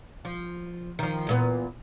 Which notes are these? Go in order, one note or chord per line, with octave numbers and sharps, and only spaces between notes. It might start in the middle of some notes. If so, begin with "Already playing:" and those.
F3
D#3 F3
E2 A#2 B3